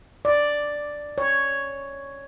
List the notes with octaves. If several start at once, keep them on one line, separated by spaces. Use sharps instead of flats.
D5
C#5